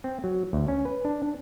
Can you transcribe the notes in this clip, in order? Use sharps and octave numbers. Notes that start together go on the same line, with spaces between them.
C4
F#3
D2
C#4
B4
D4
D4